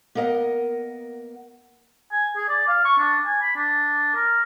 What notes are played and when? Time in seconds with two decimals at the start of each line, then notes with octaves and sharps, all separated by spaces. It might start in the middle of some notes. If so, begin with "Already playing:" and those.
0.15 A#3 B3 A#4 D#5 F#5
2.12 G#5
2.37 G#4
2.49 D5
2.68 F5
2.85 C#6
2.98 D4
3.26 G#5
3.42 B5
3.56 D4
4.15 A#4